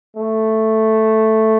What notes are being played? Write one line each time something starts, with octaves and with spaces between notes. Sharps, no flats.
A3